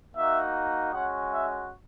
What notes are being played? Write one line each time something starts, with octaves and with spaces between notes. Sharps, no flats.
A#3 D#4 F#4 E5
G#3 C#4 F#4 F#5
E5